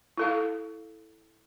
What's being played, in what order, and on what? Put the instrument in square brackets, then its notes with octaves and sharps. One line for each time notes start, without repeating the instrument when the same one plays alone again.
[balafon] E4 A4 F5